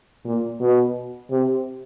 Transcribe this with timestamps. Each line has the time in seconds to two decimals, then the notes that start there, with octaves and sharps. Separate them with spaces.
0.24 A#2
0.60 B2
1.31 C3